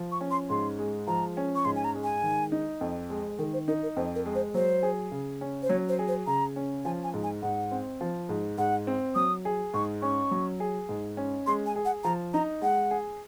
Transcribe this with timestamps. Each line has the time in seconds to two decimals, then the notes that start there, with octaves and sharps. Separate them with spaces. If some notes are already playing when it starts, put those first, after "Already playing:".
Already playing: F3
0.12 C#6
0.21 C#4
0.31 C6
0.50 G#2 C6
0.79 G#3
1.07 F3 A#5
1.37 C#4
1.55 C#6
1.65 G#2 C6
1.76 G#5
1.84 A#5
1.95 G#3
2.04 G#5
2.23 D#3
2.52 D#4
2.81 F2
3.10 G#3
3.39 D#3 A#4
3.53 C5
3.68 D#4 A#4
3.83 A#4
3.96 F2 C5
4.15 A#4
4.26 G#3
4.35 C5
4.54 F#3 C5
4.83 G#4
5.11 C#3
5.41 C#4
5.63 C5
5.69 F#3 C#5
5.89 C5
5.99 G#4
6.08 C5
6.27 C#3 A#5
6.56 C#4
6.85 F3 G#5
7.04 G#5
7.14 G#2
7.23 G#5
7.42 G#2 F#5
7.72 C4
8.01 F3
8.29 G#2
8.58 G#2 F#5
8.87 C4
9.15 F#3 D#6
9.45 G#4
9.74 G#2 C#6
10.02 C#4 C#6
10.31 F#3
10.60 G#4
10.89 G#2
11.17 C#4
11.47 G#3 C6
11.66 G#5
11.76 G#4
11.85 F#5
12.04 F3 A#5
12.34 D#4 A#5
12.62 G#3 F#5
12.91 G#4